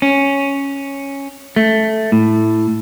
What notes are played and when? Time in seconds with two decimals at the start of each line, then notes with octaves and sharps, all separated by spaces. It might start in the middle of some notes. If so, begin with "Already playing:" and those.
0.02 C#4
1.56 A3
2.12 A2